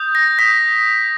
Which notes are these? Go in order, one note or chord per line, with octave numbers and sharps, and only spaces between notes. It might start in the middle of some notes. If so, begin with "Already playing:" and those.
Already playing: D#6 G6
A#6
D#6 G6 B6